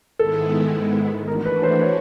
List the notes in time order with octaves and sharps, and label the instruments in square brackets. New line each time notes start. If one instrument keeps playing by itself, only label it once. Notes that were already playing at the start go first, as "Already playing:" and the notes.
[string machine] G#2 D#3 G#3 B3 E4 [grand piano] A4
[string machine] E3 A3 D4 F#4 [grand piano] A#4
[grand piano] B4
C5
C#5